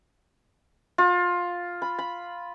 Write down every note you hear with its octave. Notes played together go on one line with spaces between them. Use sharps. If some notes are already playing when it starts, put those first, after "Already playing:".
F4
B5
B5